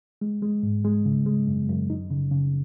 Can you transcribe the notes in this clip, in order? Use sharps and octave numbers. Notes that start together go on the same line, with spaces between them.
G#3
G#3
G#2
G#3
C#3
G#3
F#2
F#2
D#4
C#3
C#3